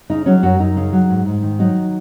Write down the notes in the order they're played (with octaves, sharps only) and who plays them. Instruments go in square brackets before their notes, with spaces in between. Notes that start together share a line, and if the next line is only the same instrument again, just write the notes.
[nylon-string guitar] C#3 D#4
F#3 C#4
F#2 F#4
F#2 D#4
C#3
F#3
G#2
G#2
D#3
F#3 D#4